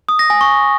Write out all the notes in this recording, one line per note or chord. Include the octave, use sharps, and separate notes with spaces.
D#6
A#6
G#5
C#6